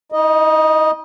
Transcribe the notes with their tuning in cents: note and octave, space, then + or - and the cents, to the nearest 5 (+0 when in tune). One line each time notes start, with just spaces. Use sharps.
D#4 +45 D#5 -5